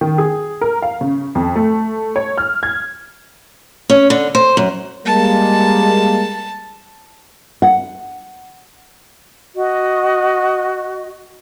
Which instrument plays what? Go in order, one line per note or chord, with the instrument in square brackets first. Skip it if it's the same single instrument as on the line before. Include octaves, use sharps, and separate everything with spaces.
[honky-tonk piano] D#3
G#4
A#4
F5
C#3
F2
A3
C#5
F6
G#6
[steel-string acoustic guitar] C#4
D3
C5
F#2
[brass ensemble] G3 G#3 A#3 [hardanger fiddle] A5
[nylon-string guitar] F#5
[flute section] F#4 D#5